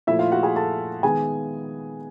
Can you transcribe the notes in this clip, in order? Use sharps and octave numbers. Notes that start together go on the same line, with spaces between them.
A#2 F3 A3 E4 E5
F4 F5
F#4 F#5
G#4 G#5
A4 A5
D#3 G#3 B3 G#4 G#5